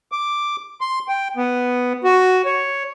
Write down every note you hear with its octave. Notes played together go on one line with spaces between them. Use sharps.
D6
C6
G5
B3
F#4
C#5